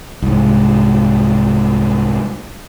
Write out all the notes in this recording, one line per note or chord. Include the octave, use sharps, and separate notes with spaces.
C2 G#2